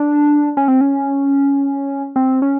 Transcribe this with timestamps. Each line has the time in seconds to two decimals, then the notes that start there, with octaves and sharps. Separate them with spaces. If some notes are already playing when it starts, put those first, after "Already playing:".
Already playing: D4
0.57 C#4
0.68 C4
0.81 C#4
2.16 C4
2.42 C#4